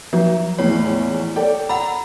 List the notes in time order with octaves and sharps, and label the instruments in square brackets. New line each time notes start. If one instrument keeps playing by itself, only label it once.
[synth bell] F3 [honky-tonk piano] F#3
[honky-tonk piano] A#1 E2 A2 [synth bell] C#5
[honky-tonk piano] A4 D5 G5
[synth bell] F#5 B5 [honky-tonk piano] A#5